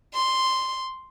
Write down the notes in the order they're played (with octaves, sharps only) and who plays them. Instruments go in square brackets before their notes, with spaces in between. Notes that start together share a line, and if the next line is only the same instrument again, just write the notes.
[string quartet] C6